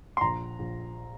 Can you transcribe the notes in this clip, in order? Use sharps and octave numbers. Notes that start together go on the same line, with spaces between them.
C6
A#1 A#5
A#1